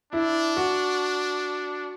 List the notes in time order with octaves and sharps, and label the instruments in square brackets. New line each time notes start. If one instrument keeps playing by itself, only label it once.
[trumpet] D4 [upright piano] E4
[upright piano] F#4